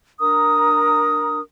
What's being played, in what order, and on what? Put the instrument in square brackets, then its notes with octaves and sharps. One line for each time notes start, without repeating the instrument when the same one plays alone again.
[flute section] D4 A#4 A#5 D#6